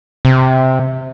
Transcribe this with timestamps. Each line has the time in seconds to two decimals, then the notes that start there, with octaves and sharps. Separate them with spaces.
0.25 C3